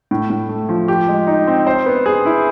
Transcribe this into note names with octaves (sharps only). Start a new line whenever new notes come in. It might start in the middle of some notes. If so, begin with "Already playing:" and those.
A2
A2
A3
F3
G4
G#3
D#4
C4
C5
B3
G#4
E4